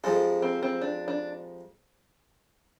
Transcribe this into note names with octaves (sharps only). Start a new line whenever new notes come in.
F2 C3 F3 G#3 A4
C4
C4
D4
D4